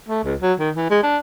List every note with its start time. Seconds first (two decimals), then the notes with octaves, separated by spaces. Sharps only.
0.09 A3
0.24 C#2
0.42 F#3
0.60 D#3
0.75 E3
0.90 G#3
1.03 D4